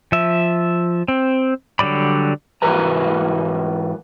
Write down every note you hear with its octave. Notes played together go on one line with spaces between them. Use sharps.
F3 E5
C4
D3 F#3 G3 D5 B5
G#2 E3 F#4 A#4 B4 A#5